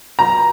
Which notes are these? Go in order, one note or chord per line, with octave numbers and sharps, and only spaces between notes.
A#5